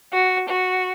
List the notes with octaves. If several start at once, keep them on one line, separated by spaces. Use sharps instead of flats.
F#4
F#4